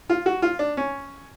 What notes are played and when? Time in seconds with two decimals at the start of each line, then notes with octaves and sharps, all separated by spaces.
0.09 F4
0.26 F#4
0.42 F4
0.59 D4
0.77 C#4